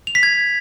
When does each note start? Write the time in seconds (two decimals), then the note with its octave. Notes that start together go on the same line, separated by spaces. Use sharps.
0.07 F7
0.15 B6
0.23 G#6